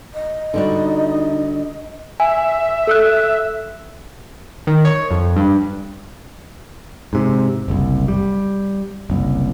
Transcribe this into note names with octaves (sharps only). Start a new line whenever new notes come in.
D#5
D3 G3 D#4 F#4
E5 G#5
A4 E6 F#6
D#3
C#5
F2
G2
G#2 C3
F#1 C2
G3
F#1 C2